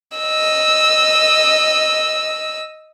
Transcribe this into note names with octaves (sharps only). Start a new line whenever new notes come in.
D#5 E6